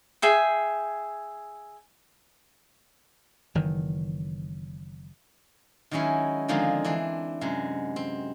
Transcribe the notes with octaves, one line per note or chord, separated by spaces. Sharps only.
G#4 E5 G5
F#1 D#3 E3
D#3 F#3 G#3 C#4 E4
D3 D#3 F3 G#3 C4 D#4
E3 D4 E4 C5
F#2 C3 G#3
C4